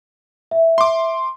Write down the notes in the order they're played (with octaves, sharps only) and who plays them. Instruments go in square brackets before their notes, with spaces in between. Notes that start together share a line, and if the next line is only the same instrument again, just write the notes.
[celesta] E5
[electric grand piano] C6 D6